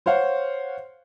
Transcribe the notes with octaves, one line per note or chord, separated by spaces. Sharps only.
C5 C#5 F5 F#5